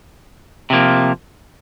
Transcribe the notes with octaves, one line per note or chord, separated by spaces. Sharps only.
C3 F3 A#3